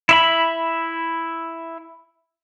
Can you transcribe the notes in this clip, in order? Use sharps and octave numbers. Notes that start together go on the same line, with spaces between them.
E4 E5 B5